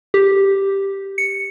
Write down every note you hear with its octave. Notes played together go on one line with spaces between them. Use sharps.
G4
C#7